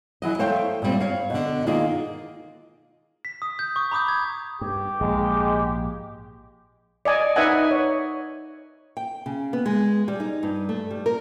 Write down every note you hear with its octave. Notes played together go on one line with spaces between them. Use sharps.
E3 F#3 D#5
A3 C5 C#5 F5 G5
A#2 G3 C4
C#5 F5
B2 D3
D#3 A#3 F4 G#4 D#5
B6
D#6
G6
C#6 D#6
A#5 B5 D6 D#6 G6
G#6
G2 G4
A#1 G#2 G#3
D5 D#5 G#5
D#4 B4 D#5 E5 F#5 G#5
C#5
G5
C#3
B3
G#3
G3
D#4
G2
A3
G3
A#4